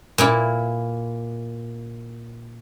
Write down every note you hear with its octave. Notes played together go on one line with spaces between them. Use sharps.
A#2 A#3 E4